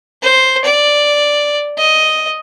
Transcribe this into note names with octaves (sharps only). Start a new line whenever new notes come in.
C5
D5
D#5